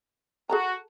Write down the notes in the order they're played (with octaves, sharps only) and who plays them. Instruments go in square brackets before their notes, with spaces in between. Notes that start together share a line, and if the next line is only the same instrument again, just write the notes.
[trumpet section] F#4 [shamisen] G#4 A4 A#5